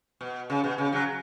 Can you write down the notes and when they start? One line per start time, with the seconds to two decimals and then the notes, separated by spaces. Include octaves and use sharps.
0.21 B2
0.50 C#3
0.64 B2
0.78 C#3
0.92 C#3 F#3